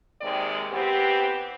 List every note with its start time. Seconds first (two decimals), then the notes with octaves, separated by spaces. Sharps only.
0.21 D#2 C3 D#3 G#3 D5
0.71 E3 B3 C4 G4